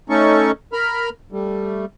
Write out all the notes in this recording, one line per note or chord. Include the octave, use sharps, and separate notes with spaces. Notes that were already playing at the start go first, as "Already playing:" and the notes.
A3 C#4 D#4 A4 C#6
A#4 B5 F6
G3 A3